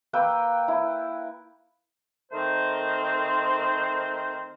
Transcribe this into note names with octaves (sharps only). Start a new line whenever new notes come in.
A#3 B4 G5 E6
E4
D#3 A3 C4 A#4 C5